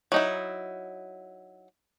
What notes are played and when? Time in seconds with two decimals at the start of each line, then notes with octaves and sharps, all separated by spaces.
0.12 F#3 D#4 E4